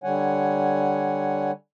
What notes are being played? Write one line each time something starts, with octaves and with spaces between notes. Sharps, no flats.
D3 G3 C#5 F#5 G#5